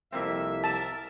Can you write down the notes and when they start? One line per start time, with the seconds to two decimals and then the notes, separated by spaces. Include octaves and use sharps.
0.13 C2 F2 A#3 C4 E5
0.64 A#4 E5 A5